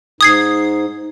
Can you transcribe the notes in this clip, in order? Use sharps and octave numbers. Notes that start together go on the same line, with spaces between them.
G#2 D#6 G#6 C7